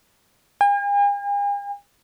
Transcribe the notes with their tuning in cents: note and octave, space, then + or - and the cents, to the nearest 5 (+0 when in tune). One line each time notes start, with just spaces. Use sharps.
G#5 -45